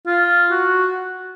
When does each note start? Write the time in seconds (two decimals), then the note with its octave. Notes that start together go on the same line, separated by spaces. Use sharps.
0.07 F4
0.51 F#4